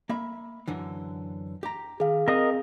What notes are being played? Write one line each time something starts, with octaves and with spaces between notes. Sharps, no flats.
A#3 E5 B5
F#2 D3 E3
G4 A#5
D#3 G#4 F5
C4 A#4 D#5 D#6